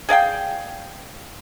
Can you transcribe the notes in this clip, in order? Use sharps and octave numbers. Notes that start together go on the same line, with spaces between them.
G#4 D5 F5 G5